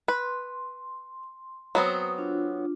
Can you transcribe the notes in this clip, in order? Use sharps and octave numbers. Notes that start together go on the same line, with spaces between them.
B4 C6
F#3 B3 C4 D#6
D4 F4